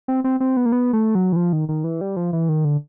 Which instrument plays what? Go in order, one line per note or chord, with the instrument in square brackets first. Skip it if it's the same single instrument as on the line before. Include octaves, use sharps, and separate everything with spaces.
[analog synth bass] C4
C4
C4
B3
A#3
B3
A3
F#3
E3
F3
D#3
D#3
E3
G3
F3
E3
D#3
D3